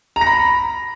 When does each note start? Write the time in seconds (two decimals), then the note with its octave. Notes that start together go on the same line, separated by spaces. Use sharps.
0.16 A#5
0.21 A#6
0.27 B5